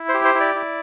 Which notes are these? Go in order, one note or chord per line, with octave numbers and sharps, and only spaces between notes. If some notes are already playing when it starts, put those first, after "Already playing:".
Already playing: E4
C5
G4
C5
E4
D5
E4